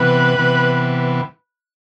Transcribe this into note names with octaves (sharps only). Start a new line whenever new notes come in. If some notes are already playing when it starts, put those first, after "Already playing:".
Already playing: C3 E3 B3 B4
C3 E3 B3